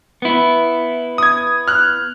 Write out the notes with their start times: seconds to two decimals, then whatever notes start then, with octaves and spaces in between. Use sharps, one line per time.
0.22 B3 E4
1.18 D#6 G#6
1.68 F6 F#6